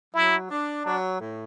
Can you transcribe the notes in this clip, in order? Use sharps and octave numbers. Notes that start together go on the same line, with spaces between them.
F#3 E4
D4
F#3 D4
A2